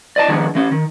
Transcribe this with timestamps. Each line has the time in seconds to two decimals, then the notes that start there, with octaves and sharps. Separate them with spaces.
0.16 D5 D#5 A5
0.28 D#3 F3 G#3 B3 D4
0.55 E3 C#4
0.72 D#3